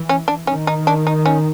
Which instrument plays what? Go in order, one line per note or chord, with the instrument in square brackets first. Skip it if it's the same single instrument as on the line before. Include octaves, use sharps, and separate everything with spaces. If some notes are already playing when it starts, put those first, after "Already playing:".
Already playing: [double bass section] E3
[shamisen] C#4
D4
[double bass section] D#3 [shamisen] C#4
[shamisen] D#4
D4
D#4
C#4